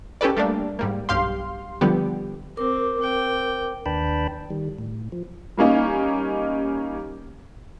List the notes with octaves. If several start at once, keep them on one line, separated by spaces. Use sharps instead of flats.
C#4 G4 A4 B4 D5
G3 A3 A#3 D4
G#2 G3 A#3
B1 G2 G4 F5 C6
D3 F3 G3 B3 G4
C4 A#4 D6
C4 G5
D#2 D4 B4 G5 A5 B5
D#3 G3
A2
F3
G3 A#3 C#4 D#4